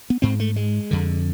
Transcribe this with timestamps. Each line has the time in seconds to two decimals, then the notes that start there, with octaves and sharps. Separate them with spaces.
0.10 B3
0.22 G#2 C4
0.40 A3
0.56 G#3
0.91 F2 D3